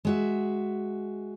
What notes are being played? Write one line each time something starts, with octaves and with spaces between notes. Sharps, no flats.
G#3 F#4 E5